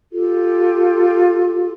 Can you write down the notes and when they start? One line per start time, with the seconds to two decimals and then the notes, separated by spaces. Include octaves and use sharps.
0.11 F4 G4 A4